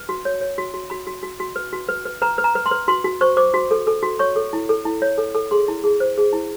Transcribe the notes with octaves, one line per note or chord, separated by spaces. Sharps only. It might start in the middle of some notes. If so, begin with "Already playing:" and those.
Already playing: B4
F#4
C#5
C#5
F#4
F#4
F#4 B5
F#4
F#4
F#4
B4
F#4
B4
B4
B4 A#5
B4
A#5
B4
C6
B4
F#4 C6
F#4
C5 C#6
C5 D6
F#4
A4
A4
F#4
C#5 C#6
A4
E4
A4
E4
C#5
A4
A4
G#4 C6
E4
G#4
C5
G#4
E4